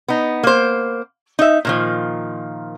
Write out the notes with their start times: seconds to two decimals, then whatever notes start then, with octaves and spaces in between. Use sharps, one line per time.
0.08 B3 D#4
0.43 A#3 C5
1.39 D#4 E5
1.65 A#2 D#3 F3